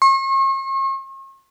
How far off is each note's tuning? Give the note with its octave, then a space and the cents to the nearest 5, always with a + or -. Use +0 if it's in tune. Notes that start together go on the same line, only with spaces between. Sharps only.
C#6 -45